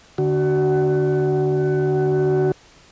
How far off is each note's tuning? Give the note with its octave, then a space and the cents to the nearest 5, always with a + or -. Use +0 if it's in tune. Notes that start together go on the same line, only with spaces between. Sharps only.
D3 +0 F#4 +25